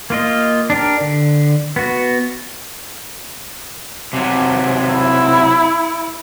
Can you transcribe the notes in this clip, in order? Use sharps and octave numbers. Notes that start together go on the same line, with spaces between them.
A#3 F4 D#5
D4 G4 A#4
D3
B3 F#4
C3 F#3
E4